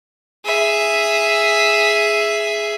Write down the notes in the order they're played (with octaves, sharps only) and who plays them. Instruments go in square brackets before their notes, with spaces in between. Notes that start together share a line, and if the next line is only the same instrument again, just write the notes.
[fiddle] G#4 E5